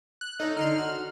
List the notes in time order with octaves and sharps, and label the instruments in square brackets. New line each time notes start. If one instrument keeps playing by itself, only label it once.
[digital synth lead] F#6
[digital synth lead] D#4 [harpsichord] A4 C#5
[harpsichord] D3 D#4 C6 [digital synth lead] F6
[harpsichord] F#4